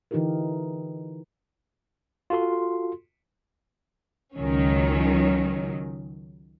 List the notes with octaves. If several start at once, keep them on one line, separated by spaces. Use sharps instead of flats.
D3 E3 D#4 F4 G4 A#4
F4 F#4 A4 C6
C#2 D#3 F#3 C#4